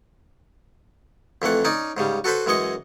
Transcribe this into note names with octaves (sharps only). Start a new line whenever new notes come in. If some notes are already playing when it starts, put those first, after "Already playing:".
F2 E3 A3 F#5
C#4 D#4 D5
G#2 C#3 G3
F#4 A4 B4 C5 B5
F#2 E3 G#3 D#5 C#6